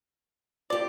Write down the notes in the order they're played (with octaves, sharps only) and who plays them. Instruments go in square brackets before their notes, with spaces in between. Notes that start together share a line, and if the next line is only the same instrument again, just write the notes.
[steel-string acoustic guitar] F4 G4 [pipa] D5